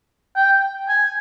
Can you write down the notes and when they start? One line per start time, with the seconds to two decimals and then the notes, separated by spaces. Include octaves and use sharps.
0.36 G5
0.89 G#5